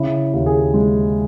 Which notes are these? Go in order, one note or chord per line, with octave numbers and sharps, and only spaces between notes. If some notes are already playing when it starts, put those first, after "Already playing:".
Already playing: C#3 E4
D#2
G#4
G#3